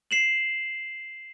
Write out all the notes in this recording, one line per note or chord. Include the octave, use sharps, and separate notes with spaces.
C7 E7 F#7